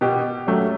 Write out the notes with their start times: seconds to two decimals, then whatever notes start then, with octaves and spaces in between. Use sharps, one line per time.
0.01 B2 G4
0.47 F#3 A3 C#4